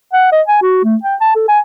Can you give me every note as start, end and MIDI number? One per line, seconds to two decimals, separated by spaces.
0.13 0.29 78
0.32 0.42 75
0.47 0.58 80
0.62 0.83 66
0.84 0.96 57
1.03 1.15 79
1.21 1.32 81
1.35 1.47 69
1.48 1.59 80